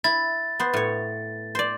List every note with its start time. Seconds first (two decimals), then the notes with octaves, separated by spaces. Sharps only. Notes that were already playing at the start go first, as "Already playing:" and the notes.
0.04 E4 A6
0.60 B3 C5
0.74 A2 C#5
1.55 C5 D5